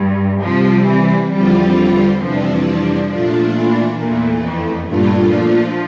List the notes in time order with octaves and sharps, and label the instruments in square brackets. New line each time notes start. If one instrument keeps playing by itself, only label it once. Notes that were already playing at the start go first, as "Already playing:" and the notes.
Already playing: [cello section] G2
[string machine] C3 G3 C4 [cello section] F3
[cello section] E3
[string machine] E2 D3 F3 C4 F4 [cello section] G3
[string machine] F2 C3 E3 G3 D4 [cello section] F3
[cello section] F3
[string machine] A#2 A3 D4 F4
[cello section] E3
[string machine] E2 E3 A3 [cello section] A#2
[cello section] F2
[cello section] G2 [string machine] A#2 A3 D4 F4
[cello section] F3